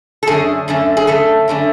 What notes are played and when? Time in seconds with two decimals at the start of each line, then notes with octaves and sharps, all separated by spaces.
0.23 A4
0.27 F#2 D3 A3 C#4 G#4
0.68 F#2 D3 A3 C#4
0.97 G#4
1.07 F#2 D3 A3 C#4 A4
1.48 F#2 D3 A3 C#4